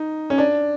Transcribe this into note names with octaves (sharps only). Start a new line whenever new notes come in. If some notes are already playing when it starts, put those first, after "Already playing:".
Already playing: D#4
C#4
D4